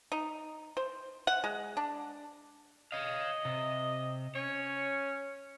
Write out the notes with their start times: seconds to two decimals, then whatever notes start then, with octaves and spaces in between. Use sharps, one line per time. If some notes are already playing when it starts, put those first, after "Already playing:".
0.12 D#4
0.77 C5
1.27 F#5
1.44 G#3
1.77 D4
2.92 C#5 D#5 F5
3.45 C3
4.35 C#4 C#5